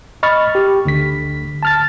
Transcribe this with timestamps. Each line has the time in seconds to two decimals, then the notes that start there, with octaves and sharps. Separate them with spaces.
0.23 D#5 B5 C#6 F6 A6
0.55 G4
0.85 D2 D3 B6
1.63 A5 F6 A6